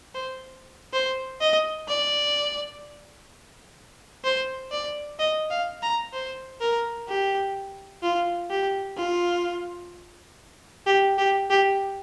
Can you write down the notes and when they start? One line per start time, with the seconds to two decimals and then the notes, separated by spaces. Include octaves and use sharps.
0.14 C5
0.93 C5
1.41 D#5
1.88 D5
4.24 C5
4.72 D5
5.19 D#5
5.51 F5
5.82 A#5
6.14 C5
6.61 A#4
7.08 G4
8.03 F4
8.50 G4
8.97 F4
10.86 G4
11.18 G4
11.50 G4